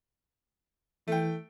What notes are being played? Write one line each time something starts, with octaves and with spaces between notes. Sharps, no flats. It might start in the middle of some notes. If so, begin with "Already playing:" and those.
E3 A3 G5